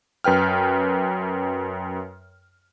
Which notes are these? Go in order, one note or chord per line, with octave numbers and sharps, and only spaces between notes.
F#2 B4 G5 F6